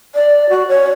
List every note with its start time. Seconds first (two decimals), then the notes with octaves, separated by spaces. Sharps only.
0.15 D5
0.50 F#4
0.68 C#5